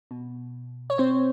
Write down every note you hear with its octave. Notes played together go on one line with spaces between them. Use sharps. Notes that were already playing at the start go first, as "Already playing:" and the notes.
B2
C#5
C4 C5